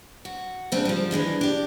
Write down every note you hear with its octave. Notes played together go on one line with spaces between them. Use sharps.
F#4
C#3 C4 D4
F3 G3
E3 F3 G#3 D4
D4 G4